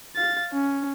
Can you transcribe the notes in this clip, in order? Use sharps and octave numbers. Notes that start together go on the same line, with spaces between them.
F5 A6
C#4